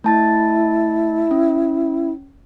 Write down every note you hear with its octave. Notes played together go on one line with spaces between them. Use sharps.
A3 E4 A5 A6
C#4